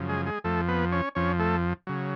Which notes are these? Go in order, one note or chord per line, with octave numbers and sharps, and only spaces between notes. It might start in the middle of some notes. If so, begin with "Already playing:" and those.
Already playing: F#2 C#3 F3
G#3 G#4
G#3 G#4
F2 F3 A3 A4
B3 B4
C#4 C#5
F2 F3 C#4 C#5
A3 A4
C#3 F#3